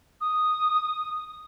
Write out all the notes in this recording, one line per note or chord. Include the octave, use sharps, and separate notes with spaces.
D#6